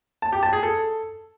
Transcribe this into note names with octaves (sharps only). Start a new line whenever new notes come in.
A5
G4
A5
G#4
A4